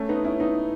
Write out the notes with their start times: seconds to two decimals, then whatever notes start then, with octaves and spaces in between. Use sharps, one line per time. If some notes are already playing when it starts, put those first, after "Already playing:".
Already playing: A3 C#4
0.09 B3 D#4
0.24 C#4 E4
0.40 B3 D#4